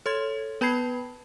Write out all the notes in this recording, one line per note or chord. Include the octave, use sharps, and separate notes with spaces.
A4 C#5 C6 G#6
B3 B4 A5 B5 G#6 C7